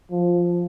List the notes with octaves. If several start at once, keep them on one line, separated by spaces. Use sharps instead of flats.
F3